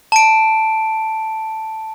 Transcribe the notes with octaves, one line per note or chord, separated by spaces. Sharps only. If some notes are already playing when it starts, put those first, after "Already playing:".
A5 D7